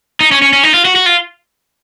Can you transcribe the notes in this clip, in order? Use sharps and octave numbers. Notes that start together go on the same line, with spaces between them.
D#4
C#4
C#4
C#4
D#4
F4
F#4
F#4
F4